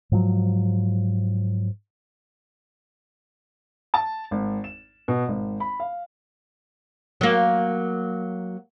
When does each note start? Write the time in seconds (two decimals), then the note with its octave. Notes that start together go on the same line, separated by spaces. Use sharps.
0.12 G#2 F3 F#3
3.94 A5
4.31 G#1
4.64 E7
5.08 B2
5.28 G#1
5.60 B5
5.80 F5
7.21 F#3 A#3